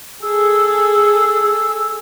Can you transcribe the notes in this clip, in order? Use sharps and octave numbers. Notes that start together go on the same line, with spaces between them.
G#4 A4 E6